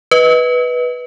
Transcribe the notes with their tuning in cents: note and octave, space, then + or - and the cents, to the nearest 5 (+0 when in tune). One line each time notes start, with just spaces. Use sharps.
B4 -5 D#5 +20